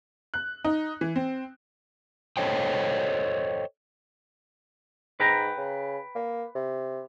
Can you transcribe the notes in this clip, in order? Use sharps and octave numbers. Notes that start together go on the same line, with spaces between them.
F#6
D#4
E3
C4
A4 C5 C#5 D#5 G5
G#2 B4 G5 A#5
C#3
A#3
C3